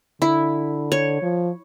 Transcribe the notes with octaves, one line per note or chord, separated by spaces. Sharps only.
D3 E4
C#5
F3